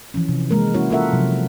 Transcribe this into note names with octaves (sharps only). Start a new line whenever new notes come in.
E3 F3 C#4
C3
E3 G#3 A#3 A#4
G#3 A#3 C#4 E4 F#4 C#5
A#3 F4 A4 A#4 E5 F#5
C3 F3 F#3